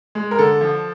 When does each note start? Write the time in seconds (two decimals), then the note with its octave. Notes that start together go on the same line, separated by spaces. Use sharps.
0.15 G#3
0.31 A#4
0.38 D3 A4
0.61 F3